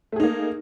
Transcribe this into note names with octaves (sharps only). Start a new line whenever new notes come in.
A3 A#3 D#4 G#4